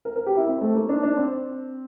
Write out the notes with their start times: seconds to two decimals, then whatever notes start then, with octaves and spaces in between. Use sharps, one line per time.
0.05 A#4
0.16 A#4
0.26 G4
0.37 E4
0.47 C4
0.61 A3
0.75 A#3
0.89 D4
1.03 D4
1.17 C4